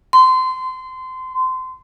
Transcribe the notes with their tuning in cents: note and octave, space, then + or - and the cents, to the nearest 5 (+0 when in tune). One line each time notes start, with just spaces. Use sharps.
C6 -25